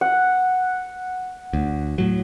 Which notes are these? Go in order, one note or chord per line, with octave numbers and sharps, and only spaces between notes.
F#5
D2
A2 F#3